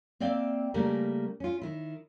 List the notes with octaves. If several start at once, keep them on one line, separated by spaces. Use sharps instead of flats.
A#3 C4 D5 E5 F5 G5
C#3 G3 A3 A#3 A#4
C#4 F4
D#3 E4